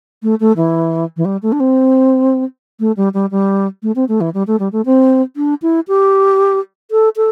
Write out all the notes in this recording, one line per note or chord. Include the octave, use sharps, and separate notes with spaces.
A3
A3
E3
E3
G3
A3
D4
C4
A3
G3
G3
G3
A3
C4
A3
E3
G3
A3
G3
A3
C4
D4
E4
G4
A4
A4